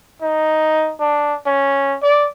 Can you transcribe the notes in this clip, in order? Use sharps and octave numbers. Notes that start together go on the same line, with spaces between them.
D#4
D4
C#4
D5